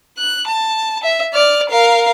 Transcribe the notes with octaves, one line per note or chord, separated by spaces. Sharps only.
F#6
A5
E5
D5 F6
A#4 F5